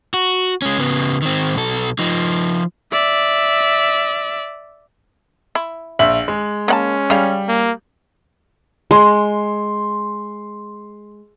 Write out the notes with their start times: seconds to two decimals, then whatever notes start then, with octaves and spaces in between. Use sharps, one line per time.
0.14 F#4
0.62 G#3 C#4
0.79 C#3 B3
1.22 D#3 C4
1.55 B1 A4
1.99 F3 D#4
2.92 D5 E5
5.55 E4
5.99 A#1 E5 F#7
6.28 G#3
6.68 A#3 C#4 F#5 A5
7.10 C#3 G3 F5
7.48 A#3
8.91 G#3 C6